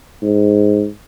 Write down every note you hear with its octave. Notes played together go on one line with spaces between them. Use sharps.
G#2